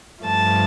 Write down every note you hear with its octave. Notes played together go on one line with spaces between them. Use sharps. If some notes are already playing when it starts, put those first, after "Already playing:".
G2 F3 A3 A5